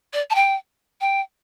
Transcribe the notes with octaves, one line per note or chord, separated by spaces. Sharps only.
D5
A5
G5
G5